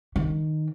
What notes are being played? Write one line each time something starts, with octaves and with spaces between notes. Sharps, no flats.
D#3